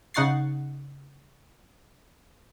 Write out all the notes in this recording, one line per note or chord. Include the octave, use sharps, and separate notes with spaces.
C#3 D#4 F#5 C#6 A6 C7